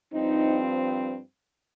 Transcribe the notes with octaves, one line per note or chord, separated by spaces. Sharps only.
G2 F3 C4 D#4